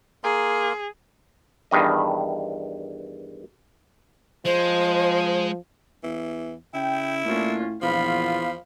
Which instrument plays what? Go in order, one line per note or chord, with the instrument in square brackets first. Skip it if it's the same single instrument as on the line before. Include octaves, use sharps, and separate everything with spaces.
[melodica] A#3 A#4 C6 [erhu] G#4
[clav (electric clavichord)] E2 G2 D#3 D#5
[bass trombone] F3 [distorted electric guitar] G#3 [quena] C5
[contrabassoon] E2 [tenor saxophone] E3
[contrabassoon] C#3 [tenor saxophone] E4 [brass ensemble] G5
[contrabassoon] A2 [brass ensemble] A3 A#3 D4 [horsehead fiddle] C#4 F4
[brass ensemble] A#1 B3 F4 [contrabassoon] E2 [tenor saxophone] F3 [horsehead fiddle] F5 B5